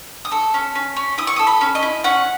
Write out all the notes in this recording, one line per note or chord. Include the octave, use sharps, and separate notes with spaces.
D#6
A4 C#6
C#4
C#4
C#4
E4 D#6
C#6
A4 D#6
B5
C#4
D#5
E4
C#4 F#5